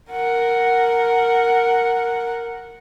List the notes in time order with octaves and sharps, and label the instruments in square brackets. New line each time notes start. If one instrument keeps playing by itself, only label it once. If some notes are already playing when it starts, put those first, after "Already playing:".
[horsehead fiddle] A#4 F#5